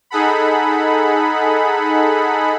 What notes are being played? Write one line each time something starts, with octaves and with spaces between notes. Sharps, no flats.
D#4 G#4 A4 F#5 B5